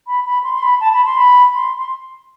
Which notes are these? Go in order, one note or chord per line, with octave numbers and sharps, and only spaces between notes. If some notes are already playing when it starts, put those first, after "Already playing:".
B5
B5
C6
C6
B5
A5
B5
C6
B5
C6
C6